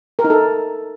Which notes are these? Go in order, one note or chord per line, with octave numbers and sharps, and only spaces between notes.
A#4
D#4
A4